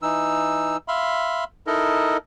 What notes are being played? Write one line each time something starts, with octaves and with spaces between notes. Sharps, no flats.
E3 D#4 E6
E5 F5 B5 C6
D#4 E4 A4 A#4 D#5